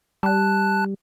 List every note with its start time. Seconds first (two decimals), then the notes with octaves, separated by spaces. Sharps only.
0.23 G3 A5 F#6